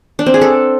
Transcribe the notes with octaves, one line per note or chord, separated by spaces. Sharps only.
D4
C4
G#4
A4